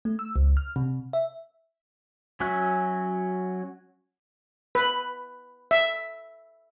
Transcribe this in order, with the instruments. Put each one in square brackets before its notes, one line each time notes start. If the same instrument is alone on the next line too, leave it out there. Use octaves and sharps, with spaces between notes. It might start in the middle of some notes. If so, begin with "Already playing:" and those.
[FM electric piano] A3
E6
C#2
F6
C3
E5
[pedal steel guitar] F#3 C#4 F#4 E5 F#6
[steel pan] B4
E5